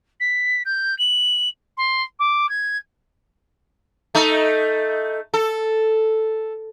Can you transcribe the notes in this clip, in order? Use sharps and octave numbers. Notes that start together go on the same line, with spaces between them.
B6
G6
F#7
C6
D6
G#6
A3 D#4
A4